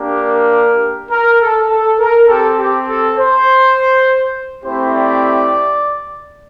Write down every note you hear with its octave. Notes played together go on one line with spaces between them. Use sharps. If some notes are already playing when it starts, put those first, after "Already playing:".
Already playing: A#3 D4 G4
A#4
A#4
A4
A4
A#4
C4 G4 A4
G4
A4
C5
A3 C4 E4 G4 C5
D5